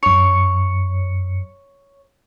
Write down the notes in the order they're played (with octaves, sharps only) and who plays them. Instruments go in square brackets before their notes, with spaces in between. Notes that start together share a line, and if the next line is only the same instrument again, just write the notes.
[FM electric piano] F#2 C#7 [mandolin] C#5